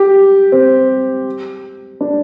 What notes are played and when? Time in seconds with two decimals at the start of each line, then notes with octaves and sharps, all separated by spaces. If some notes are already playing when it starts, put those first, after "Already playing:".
Already playing: G4
0.52 C4
2.01 D4